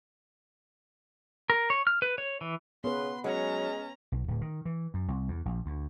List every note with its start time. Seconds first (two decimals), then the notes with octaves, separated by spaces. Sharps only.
1.50 A#4
1.70 C#5
1.87 F6
2.02 B4
2.18 C#5
2.41 E3
2.84 C#3 B3 B4 C6
3.24 F#3 G#3 C#4 A#5
4.12 B1
4.28 D1
4.41 D#3
4.65 E3
4.94 F#2
5.08 C2
5.28 E2
5.45 A#1
5.66 D2